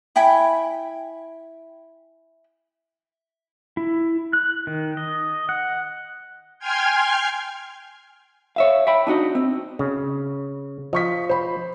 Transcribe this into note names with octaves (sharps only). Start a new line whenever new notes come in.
E4 G5 G#5 B5
E4
F#6
D#3
D#5
F#5
G5 G#5 C6 F6 G#6
C#5 E5 F5
E5 G5 B5
D4 D#4 F#4 D#5
C4
C#3
F3 D#5 C#6 B6
C5 B5